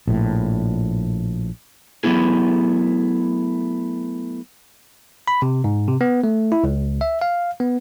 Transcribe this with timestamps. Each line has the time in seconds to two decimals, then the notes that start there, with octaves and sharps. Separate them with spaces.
0.07 A#1 A2
2.04 F#3 A3 B3 E4 G#4
5.28 B5
5.42 C3
5.64 G#2
5.88 C3
6.01 B3
6.24 A3
6.52 E4
6.64 C#2
7.01 E5
7.22 F5
7.60 B3